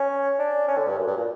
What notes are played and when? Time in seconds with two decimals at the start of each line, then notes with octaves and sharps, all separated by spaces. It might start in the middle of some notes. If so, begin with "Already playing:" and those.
Already playing: C#4
0.39 D4
0.68 C#4
0.78 D3
0.88 G2
0.98 F#2
1.07 G2
1.17 A#2